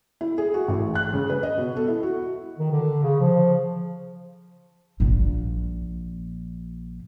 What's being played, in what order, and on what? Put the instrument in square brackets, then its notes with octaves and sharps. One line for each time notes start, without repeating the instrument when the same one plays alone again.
[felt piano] E4
G#4
F#4
A1
F#6
C#3
B4
D#5
B2
A4
E4
F#4
[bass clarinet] D#3
D3
C#3
F3
[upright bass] A#1 A#2